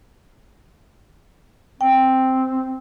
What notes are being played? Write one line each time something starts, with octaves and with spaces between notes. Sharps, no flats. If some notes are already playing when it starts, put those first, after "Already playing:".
C4 G5